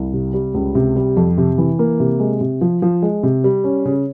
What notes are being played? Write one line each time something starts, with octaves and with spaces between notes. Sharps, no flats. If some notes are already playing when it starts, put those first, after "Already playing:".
Already playing: C2
C3
G3
C#2
C3
G3
F2
C3
E3
A#3
C3
G#3
C3
F3
F3
G#3
C3
G3
C#4
C#3